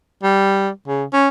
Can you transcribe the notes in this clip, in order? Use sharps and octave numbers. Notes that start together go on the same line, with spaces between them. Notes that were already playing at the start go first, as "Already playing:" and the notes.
G3
C#3
C#4